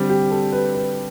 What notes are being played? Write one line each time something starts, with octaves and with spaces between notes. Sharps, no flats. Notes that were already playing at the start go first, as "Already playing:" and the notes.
Already playing: D3 G3 C4
G4
A4
B4
B4